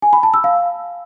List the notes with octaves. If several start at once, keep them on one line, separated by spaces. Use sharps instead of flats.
G#5
B5
A5
E6
F5